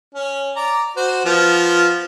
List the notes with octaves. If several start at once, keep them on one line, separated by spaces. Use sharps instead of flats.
C#4
D5 A#5
F#4 C5
F3 B3 F4